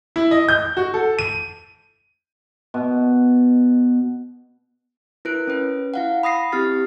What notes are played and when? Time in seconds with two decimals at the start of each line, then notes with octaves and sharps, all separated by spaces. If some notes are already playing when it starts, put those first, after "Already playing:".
0.16 E4
0.31 D#5
0.49 G6
0.77 F#4
0.94 A4
1.19 D#7
2.74 B2
5.25 E4 A#4 B4 F#6 D7
5.47 C#4 B4
5.94 E4 F5 F#5
6.23 B5 D#6 A#6 C7
6.52 C4 E4 G4 F6 A6 C7